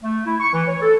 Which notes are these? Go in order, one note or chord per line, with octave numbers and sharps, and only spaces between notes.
A3
E4
C#6
E3
C#5
A4